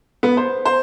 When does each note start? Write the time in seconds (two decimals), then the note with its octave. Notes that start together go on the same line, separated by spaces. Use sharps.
0.23 B3
0.37 C5
0.65 C5